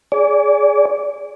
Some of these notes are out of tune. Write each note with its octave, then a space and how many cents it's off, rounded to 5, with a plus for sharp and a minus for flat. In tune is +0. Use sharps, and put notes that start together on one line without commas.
G#4 +0 D5 -30